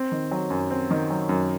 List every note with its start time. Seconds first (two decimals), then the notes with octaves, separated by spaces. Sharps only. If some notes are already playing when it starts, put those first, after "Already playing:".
Already playing: C4
0.12 D#3
0.31 F#3
0.50 F#2
0.70 C4
0.91 D#3
1.10 F#3
1.29 F#2